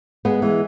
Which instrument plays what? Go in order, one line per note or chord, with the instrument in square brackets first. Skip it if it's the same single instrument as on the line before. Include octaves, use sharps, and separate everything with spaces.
[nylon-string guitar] G#3 B3
E3 G#3